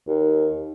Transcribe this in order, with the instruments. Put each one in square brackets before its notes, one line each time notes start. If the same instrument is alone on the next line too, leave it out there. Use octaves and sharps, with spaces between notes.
[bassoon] D#2